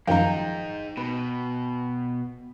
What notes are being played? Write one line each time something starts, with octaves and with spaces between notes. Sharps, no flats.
F#2 D#3 F3 G#3 D#4 F5 G5 A#5
B2 B4